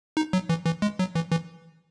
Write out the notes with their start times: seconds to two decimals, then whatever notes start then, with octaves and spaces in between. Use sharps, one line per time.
0.17 D#4
0.33 F#3
0.49 E3
0.66 E3
0.82 G#3
0.99 F#3
1.15 E3
1.31 E3